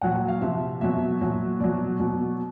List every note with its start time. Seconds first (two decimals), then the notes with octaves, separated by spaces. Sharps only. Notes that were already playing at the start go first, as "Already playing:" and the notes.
0.01 A#2 F#3 F#5
0.15 F#5
0.28 F5
0.41 C3 F3 E5
0.81 B2 F#3 E5
1.21 A#2 F#3
1.60 B2 F#3 D5
2.00 B2 F#3